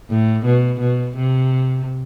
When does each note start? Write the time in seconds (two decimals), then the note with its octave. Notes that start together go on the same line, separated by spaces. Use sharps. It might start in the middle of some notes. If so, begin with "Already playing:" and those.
0.10 A2
0.46 B2
0.81 B2
1.18 C3